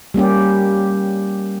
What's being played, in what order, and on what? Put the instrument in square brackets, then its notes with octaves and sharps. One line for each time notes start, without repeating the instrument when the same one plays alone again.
[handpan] G3 A#3 C#4 G4